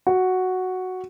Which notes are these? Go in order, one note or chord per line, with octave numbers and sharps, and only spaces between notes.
F#4